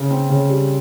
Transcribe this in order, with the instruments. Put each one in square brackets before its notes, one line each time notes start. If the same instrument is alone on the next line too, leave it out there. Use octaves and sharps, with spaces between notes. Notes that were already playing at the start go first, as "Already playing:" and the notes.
Already playing: [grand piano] C#3
C4
C#3
G3